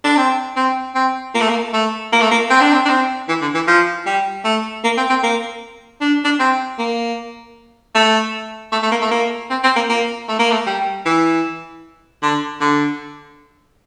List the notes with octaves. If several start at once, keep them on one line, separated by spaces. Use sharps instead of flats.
D4
C4
C4
C4
A#3
A3
A#3
A3
A#3
A3
A#3
C4
D4
C4
D4
C4
E3
D3
E3
F3
G3
A3
A#3
C4
C4
A#3
D4
D4
C4
A#3
A3
A3
A3
A#3
A3
A#3
C4
C4
A#3
A#3
A3
A#3
A3
G3
E3
D3
D3